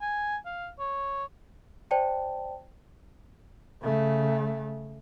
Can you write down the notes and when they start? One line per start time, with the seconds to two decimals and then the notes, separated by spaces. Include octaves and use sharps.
0.01 G#5
0.45 F5
0.79 C#5
1.91 C5 D5 G5 A5
3.82 C#3 A3